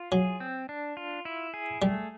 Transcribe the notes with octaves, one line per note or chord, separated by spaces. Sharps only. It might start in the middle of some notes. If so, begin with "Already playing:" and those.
Already playing: F4
F#3 G#4
C4
D4
F4
E4
G#4
G3 A3